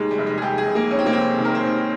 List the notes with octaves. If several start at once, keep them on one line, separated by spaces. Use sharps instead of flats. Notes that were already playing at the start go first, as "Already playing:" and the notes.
Already playing: D#2 G#3
G3
F1
G#3
G#4
F1 G4
G#4
F1
A#3
D#2 C#4
C4
A#3
F1 C4
D#3
A#4
C5
D#2